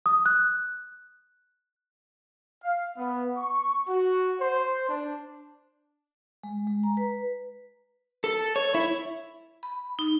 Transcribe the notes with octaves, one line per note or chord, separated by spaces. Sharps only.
D#6
F#6
F5
B3
C#6
F#4
C5
D4
G#3
G#3
A#5
B4
A4
C#5
E4
B5
D#4